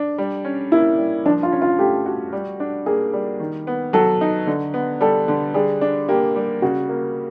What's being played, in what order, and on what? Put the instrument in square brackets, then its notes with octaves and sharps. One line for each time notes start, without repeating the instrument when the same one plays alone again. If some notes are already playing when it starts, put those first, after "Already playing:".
Already playing: [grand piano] D4
G3
C#4
[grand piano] A#3 [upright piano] E4
[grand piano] G3
[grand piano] F3 [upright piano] D4
[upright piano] F4
[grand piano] C#4
[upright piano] F4
[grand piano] A3 [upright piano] G4
[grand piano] F#4
G3
D4
[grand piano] A#3 [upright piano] G#4
[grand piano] G3
D#3
B3
[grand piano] F#3 [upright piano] A4
[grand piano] D#4
D3
B3
[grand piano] G3 [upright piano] A4
[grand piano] D3
[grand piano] G3 [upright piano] G#4
[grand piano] D4
[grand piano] A#3 [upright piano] G4
[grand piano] G3
[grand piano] C#3 [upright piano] F#4
[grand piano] A#3